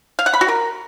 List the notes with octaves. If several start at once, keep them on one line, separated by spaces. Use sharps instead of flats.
F5
F#5
B5
F#4
A#4